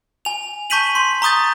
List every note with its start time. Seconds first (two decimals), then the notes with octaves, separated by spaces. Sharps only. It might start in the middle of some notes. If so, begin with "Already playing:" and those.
0.25 G#5 F7
0.70 A5 C#6 G6 B6 D#7 F#7
0.95 C6
1.22 A#5 C#6 D#6 G6 A6